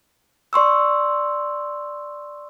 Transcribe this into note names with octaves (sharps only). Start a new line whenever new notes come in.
D5 C6 C#6 E6